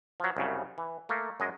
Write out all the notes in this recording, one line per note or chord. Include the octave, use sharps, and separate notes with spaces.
F3 F#3
C2 F#2 C#3
E3
A3 A#3
F#2 G#3 D#5